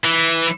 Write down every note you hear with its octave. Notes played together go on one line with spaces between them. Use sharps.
E3